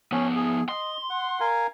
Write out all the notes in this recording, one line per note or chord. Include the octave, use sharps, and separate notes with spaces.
F3 B3 C#4
G#4
D#5 C6
F#5
A#4 F5 G#5